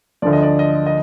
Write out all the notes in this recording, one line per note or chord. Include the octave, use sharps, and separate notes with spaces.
D2 D3 F3 D5
D#5
D5
D#5
D#5